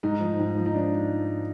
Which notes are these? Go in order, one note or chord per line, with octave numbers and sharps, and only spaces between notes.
G#2 D#4
F3
G#2
F3
D#4
D4